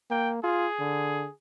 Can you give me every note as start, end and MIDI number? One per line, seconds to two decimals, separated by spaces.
0.11 0.42 58
0.11 0.32 79
0.44 0.67 65
0.44 1.32 68
0.79 1.26 50